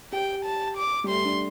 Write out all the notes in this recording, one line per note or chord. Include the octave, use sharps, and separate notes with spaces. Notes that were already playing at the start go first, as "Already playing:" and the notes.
G4 G5
A5
D6
G3
A3 C6
D4